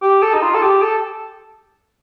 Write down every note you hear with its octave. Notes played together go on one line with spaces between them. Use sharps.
G4
A4
D#4
F4
A4
G4
A4